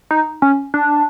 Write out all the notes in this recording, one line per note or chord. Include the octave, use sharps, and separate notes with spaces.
D#4
C#4
D4